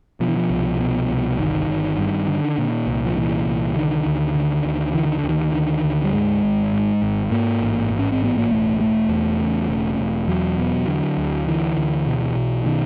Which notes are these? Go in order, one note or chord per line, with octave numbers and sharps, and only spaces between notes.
B2 F3
E3
F3
C2
B2
C2
G1 D#3
G1
G2
D3
A#2
C2
F3
A#2 E3
C2
D3 D#3
D2
D3
D2
D3 E3
D#3
D3
D2
D#3
D3
D2
G3
G#2 G#3
G#1
G#2
G#1
G#2 A#3
A1
G#2
C#4
C4
A1 B3
A#3
E1 A3
E1 A3
E2
C#3
E1
E1
E2 F#3
B2
D3
D2
D3 E3
D2
B2
B1
B2 D#3